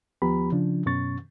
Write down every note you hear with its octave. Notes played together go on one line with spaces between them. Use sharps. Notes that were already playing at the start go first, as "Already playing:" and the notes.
D#2 F3 B3 G4 A#5 B5
C#3 F3 D4
F#2 B2 C#4 C#6 A6